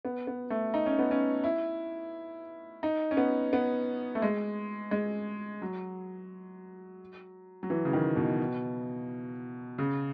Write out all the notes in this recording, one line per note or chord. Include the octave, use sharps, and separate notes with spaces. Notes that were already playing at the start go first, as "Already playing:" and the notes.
B3
B3
A3
D#4
C#4
B3
C#4
E4
D#4
C#4
B3
B3
A3
G#3
G#3
F#3
F#3
E3
C#3
D#3
B2
C#3